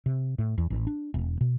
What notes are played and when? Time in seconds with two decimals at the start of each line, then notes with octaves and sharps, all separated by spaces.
0.06 C3
0.38 A2
0.58 E2
0.70 A1
0.87 D4
1.14 E1
1.41 B2